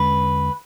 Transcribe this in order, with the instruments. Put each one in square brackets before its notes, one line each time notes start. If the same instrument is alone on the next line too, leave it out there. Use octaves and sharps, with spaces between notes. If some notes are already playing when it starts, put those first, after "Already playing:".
Already playing: [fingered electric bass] E2 D3 G#3 C#4 [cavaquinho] B4